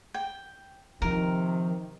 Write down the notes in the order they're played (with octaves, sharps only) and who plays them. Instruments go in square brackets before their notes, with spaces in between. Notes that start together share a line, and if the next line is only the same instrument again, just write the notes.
[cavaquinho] G5
[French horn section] C3 D#3 [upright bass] F3 [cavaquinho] A#4